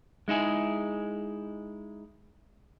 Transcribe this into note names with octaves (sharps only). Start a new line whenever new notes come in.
G#3 D#4 E4 G#4